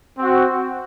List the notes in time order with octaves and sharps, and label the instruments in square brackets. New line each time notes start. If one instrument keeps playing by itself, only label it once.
[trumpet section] C4 F#4